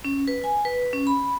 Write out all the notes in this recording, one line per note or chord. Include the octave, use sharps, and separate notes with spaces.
C#4
B4
G#5
B4
C#4
B5